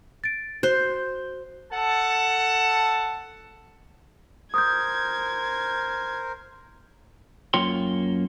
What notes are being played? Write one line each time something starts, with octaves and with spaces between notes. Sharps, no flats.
A6 D7
F#4 C5 F#6 G6
A4 F#5 A5
A#4 C5 D#6 G6 G#6
F#2 A#3 F4 C#5 G5 C6